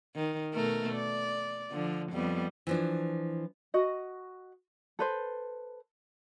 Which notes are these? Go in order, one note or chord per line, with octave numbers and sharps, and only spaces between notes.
D#3
B2 A3 A#4
D5
D3 F3
F2 G3 B3
E3 F3 D4
F#4 D#5
A4 B4 C5